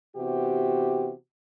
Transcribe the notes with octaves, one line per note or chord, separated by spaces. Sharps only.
C3 E3 B3 F#4 G4